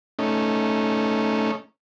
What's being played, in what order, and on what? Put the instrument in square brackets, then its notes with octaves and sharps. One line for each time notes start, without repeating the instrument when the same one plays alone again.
[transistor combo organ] A3 C#4 D#4